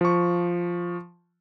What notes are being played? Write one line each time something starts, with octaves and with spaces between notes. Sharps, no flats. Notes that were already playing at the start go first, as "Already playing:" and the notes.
F3 C#6